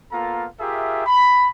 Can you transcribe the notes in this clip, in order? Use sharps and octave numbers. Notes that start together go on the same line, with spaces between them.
A#3 B3 F4 A4 F5 A#5
F4 G4 G#4 A#4 E5
B5